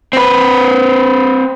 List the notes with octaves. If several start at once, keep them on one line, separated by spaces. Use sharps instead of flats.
C4 B4